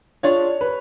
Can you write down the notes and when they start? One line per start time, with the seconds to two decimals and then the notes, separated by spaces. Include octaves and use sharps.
0.23 D4 F4 G#4 C#5
0.61 B4